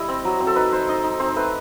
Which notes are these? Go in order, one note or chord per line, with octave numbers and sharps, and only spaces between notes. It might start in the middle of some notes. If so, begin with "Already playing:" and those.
Already playing: G3 E4 D#5
C4
F#3
C4
A4
D#4 B4
D#4 C5
D#4 D#5
D#4
C4 C5
A3 B4